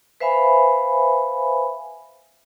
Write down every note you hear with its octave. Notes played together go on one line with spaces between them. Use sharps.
B4 C5 E5 F5 G#5 B5